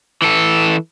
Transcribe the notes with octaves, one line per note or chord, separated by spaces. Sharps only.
E3 A4